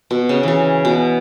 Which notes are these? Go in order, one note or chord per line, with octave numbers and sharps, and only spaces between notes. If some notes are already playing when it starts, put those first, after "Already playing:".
B2
C#3
C#3 E3
B2